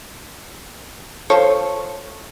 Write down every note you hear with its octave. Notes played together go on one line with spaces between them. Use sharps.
F3 A4 C#5